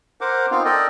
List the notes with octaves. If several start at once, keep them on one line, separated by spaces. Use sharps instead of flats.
A#4 C5 F#5 D6
B3 C4 D#4 F4 F5
A4 A#4 D5 D#5 G5